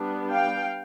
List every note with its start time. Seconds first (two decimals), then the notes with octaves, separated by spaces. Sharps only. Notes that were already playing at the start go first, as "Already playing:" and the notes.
Already playing: G3 B3 D4
0.31 F5 G5